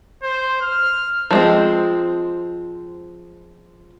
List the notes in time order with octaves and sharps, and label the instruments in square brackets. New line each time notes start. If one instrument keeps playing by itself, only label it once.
[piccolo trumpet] C5
F6
[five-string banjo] F3 G#3 C4